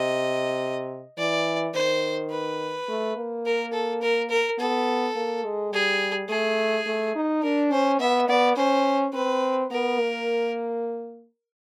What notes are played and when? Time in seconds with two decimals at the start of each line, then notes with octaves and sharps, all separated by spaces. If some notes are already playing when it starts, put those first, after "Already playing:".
Already playing: C3 D#5
1.18 E3 D5
1.74 D#3 C5
2.31 B4
2.89 A3
3.16 A#3
3.46 A#4
3.73 A4
4.02 A#4
4.30 A#4
4.58 B3 A4
5.16 A#3
5.44 G#3
5.72 G3 G#4
6.29 A3 G#4
6.86 A3
7.15 D#4
7.43 D4 A#4
7.71 C#4 C5
8.00 B3 E5
8.29 B3 D5
8.56 C#4 C5
9.14 C4 B4
9.71 B3 A#4
9.99 A#3